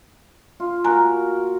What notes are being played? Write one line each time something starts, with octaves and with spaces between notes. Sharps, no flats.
F4
A#3 F#4 A#4 G#5 A#5 F#6